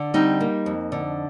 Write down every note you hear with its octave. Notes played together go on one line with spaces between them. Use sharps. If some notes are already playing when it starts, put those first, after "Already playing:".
Already playing: D3
G3 C4 D#4
A#3
F2
D3